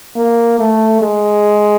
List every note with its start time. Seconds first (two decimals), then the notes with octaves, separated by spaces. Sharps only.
0.17 A#3
0.59 A3
1.02 G#3